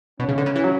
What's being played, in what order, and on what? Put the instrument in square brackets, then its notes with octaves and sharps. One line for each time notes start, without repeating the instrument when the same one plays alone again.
[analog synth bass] B2 [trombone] C#4
[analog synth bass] C#3
D3
C#3
E3
F#3